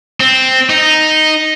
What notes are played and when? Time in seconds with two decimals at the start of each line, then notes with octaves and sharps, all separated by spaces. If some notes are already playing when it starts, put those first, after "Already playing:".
0.20 C4
0.70 D#4